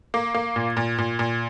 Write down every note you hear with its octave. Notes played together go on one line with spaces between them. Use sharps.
A#3
A#3
A#2
A#2
A#2
A#2